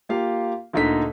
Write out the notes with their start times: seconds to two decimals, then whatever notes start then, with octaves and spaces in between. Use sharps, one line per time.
0.09 A#3 F4 G4 F5
0.73 D2 A#2 D3 D#4 D#5 B6